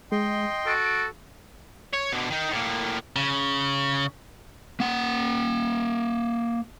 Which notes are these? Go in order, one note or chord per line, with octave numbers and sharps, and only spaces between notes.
G#3 D#5 G5 C6
F#4 A4 D7
C#5
B2 D3
D#3 D#4
A2 A#3
C#3
A#3 F#5